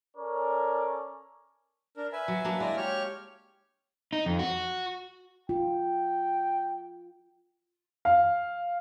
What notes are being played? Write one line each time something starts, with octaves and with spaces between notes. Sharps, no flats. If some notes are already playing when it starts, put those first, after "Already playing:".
C#4 A4 A#4 C#5 D5
D4 A#4
B4 E5 G#5
F#3
F#3 A#3 D4
G#3 E4 D5 A#5
G4 C#5 F6
D#4
F2
F#4
F4 G5
F5